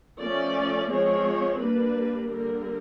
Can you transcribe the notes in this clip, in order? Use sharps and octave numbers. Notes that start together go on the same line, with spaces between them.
F3 A3 C#4 D5
F3 G#3 C4 C#5
G3 A#3 D4 B4
D3 G3 A#3 A#4